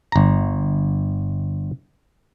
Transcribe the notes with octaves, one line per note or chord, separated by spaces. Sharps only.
G1 A#5